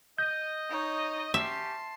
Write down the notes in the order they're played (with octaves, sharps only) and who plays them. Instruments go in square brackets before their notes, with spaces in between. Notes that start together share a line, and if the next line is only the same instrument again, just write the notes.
[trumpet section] D#5 [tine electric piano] G6
[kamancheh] D#4 C#5
[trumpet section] C#4 G4 [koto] E5 [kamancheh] A5 C6